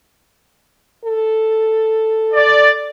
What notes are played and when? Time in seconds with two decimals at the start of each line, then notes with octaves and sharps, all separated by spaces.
1.04 A4
2.33 D5